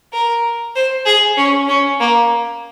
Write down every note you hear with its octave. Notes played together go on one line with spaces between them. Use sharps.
A#4
C5
G#4
C#4
C#4
A#3